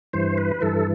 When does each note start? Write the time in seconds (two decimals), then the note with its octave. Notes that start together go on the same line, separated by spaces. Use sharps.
0.13 G2 E3 C5
0.38 B4
0.61 G2 E3 A4